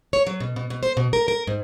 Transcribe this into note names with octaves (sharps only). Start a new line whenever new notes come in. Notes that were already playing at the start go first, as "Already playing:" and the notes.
C#5
F#3
B2
B2
B2
C5
B2
A#4
A#4
G#2